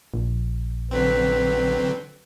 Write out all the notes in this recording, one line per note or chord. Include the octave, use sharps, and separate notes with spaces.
A#1
D3 F#3 C4 B4